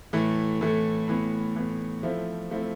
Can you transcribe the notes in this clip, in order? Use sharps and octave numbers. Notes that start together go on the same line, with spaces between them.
A2 E3 A3
A2 E3 A3
A2 E3 B3
A2 E3 B3
F3 A3 C4 E4
F3 A3 C4 E4